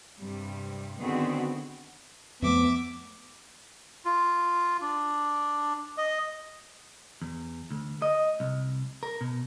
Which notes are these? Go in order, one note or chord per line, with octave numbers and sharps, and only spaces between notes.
G2 C3 G3
D3 D#3 B3 C4 F#4 G#4
F2 F3 A3 B3 E5 D6
F4
D4
D#5
E2
D2
D#5
C2
A#4
B2